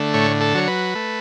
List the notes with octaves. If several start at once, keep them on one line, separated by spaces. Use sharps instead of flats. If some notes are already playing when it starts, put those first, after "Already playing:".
Already playing: D3 A3
A2 C#5
A4
F#3 C#5
B4
A3